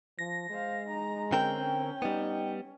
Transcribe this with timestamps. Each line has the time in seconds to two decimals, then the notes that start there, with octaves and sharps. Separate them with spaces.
0.19 F3 A#6
0.50 G#3 C5 F5
0.87 D#4 A#5
1.32 D3 C4 C#4 A#4 G5
2.02 G3 B3 D#4